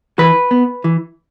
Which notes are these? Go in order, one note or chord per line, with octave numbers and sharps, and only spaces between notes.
E3 B4
B3
E3